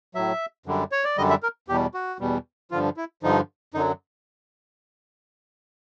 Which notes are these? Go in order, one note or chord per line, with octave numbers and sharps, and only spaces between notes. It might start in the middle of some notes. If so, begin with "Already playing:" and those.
A2 F#3 E5
F#2 D3 G3
C#5
D5
F#2 D3 G3 D#5
E5
A#4
E2 B2 G3 G4
F#4
E2 B2 G3
G2 D3 F3 F4
E4
G2 D3 F3 D#4
F#2 D3 F#3 D#4